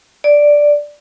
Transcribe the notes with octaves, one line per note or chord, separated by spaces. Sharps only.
D5